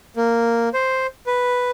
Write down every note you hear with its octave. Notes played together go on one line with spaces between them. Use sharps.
A#3
C5
B4